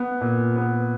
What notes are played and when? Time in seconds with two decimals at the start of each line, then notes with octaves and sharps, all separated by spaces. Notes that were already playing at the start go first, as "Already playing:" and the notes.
Already playing: B3
0.21 A#2
0.56 B3